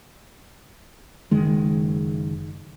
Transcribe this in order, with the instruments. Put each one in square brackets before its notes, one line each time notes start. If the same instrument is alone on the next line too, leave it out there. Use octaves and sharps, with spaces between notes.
[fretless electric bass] F#1 D#3 G#3